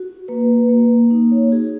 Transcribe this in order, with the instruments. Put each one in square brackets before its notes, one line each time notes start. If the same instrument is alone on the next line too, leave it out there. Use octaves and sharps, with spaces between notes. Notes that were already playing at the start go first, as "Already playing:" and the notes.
Already playing: [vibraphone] F#4
A#3 B4
A#3
D#4
C#5
F#4 G#4